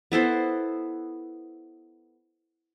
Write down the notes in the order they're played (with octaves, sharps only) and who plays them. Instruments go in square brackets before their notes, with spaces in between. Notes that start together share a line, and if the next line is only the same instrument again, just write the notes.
[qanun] B3 E4 A4 C5